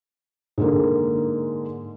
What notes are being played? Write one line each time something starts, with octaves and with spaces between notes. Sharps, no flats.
G#2 D3 A#3